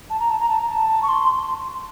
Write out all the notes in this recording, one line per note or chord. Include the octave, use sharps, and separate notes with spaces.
A5
A#5
A5
A#5
A5
A#5
A5
C#6
C6